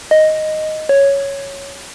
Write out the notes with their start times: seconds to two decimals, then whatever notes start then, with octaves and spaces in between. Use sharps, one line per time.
0.11 D#5
0.89 C#5